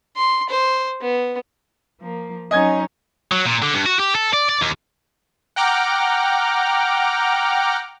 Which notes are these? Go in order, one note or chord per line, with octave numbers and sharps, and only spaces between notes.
C6
C5
B3
F3 A#3
F#3 C#4 D#4 D#5 G#5 G#6
F#3
A#2
D3
G2
F#4
G4
A4
D5
D5
D#2
F#5 G5 A#5 D6 F6